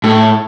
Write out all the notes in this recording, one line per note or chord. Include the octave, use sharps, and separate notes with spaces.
A2